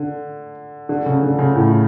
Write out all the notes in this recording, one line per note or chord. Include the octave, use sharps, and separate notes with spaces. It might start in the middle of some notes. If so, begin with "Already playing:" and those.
Already playing: D3
D3
C#3
D3
C#3
A2